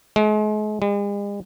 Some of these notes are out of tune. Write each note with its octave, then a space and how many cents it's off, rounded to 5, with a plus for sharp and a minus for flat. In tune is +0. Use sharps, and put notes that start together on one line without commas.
G#3 +40
G#3 -45